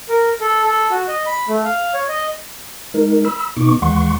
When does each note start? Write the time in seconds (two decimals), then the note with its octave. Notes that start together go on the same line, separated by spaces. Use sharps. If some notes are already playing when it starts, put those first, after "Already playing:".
0.09 A#4
0.41 A4
0.64 A4
0.90 F#4
1.08 D#5
1.27 B5
1.48 A3
1.65 F5
1.94 C#5
2.09 D#5
2.94 G#3 D#4 A#4
3.25 B5 E6
3.57 B2 B3 D#4 C#6 D6
3.82 D#2 E3 G#3 F#5 C6 C#6